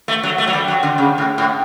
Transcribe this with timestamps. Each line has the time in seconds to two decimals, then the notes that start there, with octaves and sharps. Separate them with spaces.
0.08 A3
0.23 F#3
0.38 A3
0.48 F#3
0.53 G3
0.68 F#3
0.83 D3
0.98 C#3
1.18 A2
1.38 A2